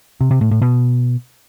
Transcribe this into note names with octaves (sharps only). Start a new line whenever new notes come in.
C3
C3
A2
A2
B2